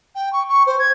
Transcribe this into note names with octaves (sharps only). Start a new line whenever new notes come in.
G5
C#6
C#6
C5
G#6